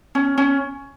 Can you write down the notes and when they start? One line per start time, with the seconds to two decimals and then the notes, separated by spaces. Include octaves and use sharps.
0.15 C#4
0.38 C#4